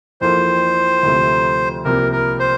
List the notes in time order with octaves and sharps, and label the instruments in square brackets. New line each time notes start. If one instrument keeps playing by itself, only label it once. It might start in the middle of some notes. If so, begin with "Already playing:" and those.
[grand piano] F2 E3 A#3 F4 A4 [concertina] C5
[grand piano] D2 C3 F3 A3
[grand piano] C2 C3 F3 A#3 [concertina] A#4
[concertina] A#4
C5